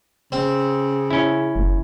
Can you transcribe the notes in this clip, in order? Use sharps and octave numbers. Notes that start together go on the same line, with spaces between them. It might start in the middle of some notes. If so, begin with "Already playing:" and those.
C#3 C4
C#4 E4
F#1